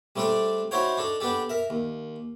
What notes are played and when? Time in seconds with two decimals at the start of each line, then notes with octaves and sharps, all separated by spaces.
0.16 G3 A3 C4 D4 A4 D5
0.71 D#4 E4 F#4 C5 C#5 G5
0.97 D4 D#4 A4
1.20 B3 D4 G4 A4
1.49 A#4 E5
1.70 D#2